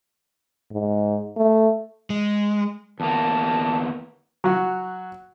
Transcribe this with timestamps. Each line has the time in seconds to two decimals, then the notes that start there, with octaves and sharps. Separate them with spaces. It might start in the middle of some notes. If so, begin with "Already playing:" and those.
0.71 G#2
1.37 A3
2.10 G#3
3.00 E2 A#3 A5
4.44 F#3 F#4